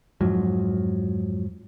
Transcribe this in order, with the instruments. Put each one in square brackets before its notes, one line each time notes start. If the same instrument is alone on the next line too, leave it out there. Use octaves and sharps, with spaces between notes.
[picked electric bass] F2 G#2 F3 F#3